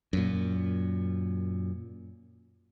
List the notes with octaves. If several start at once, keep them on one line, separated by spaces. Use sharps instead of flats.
F#2 A#2